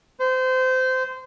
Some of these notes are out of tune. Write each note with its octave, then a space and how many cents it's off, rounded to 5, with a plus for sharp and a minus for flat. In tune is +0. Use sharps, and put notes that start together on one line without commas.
C5 -25